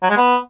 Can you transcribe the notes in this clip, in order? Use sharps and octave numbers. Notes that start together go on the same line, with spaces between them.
F#3
G#3
B3